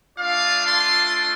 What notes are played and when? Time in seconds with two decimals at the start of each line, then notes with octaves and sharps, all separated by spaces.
0.17 A3 D4 F4 D5 F5
0.66 A5 C6